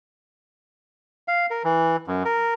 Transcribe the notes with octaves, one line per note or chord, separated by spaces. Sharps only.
F5
A#4
E3
F#2
A#4